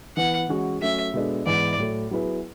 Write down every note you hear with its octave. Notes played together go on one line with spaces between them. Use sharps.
E3 B3 E4 B4 F#5
E3 G#3 C#4 F#4
F#3 A3 C#4 E5
B2 G#3 B3 D4 A4
G#2 E3 B3 E4 B4 D5
A2 F#3 A3
F#3 B3 E4 G#4 B4